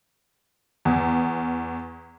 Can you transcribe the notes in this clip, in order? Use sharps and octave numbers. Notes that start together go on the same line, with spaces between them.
E2